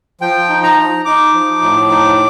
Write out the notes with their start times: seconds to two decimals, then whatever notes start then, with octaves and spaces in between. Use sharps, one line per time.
0.21 F3 G5
0.49 D#4
0.63 A#5
0.78 D#4
1.05 D#4 D6
1.34 F3
1.62 A2
1.90 D#4